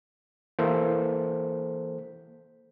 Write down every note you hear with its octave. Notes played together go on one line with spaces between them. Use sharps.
E3 A#3 A4 C5